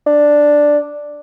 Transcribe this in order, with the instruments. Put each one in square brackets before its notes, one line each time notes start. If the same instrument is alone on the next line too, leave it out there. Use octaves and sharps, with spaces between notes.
[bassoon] D4